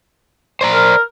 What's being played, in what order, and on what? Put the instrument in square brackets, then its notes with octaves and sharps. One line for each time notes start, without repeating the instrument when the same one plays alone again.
[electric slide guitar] C5 D5 A#5
[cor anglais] A#4